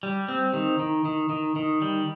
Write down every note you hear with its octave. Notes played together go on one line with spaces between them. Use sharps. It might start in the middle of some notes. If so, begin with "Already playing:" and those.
G3
C4
D#3
D#3
D#3
D#3
D#3
G3